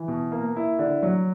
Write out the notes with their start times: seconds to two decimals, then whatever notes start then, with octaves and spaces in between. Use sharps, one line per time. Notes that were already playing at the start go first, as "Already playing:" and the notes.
Already playing: E3
0.08 B2
0.32 A#3
0.56 E4
0.79 D3
1.03 F#3